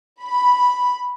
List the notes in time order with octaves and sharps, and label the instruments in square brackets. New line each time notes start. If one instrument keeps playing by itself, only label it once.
[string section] B5